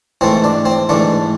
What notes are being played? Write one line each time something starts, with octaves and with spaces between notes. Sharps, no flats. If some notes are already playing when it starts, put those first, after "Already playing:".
G#2 E3 A3 C4
D4
C4
G#2 E3 A3 D4